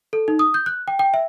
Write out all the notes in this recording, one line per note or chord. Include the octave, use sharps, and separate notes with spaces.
A4
D#4
D#6
G6
F#6
G5
G5
E5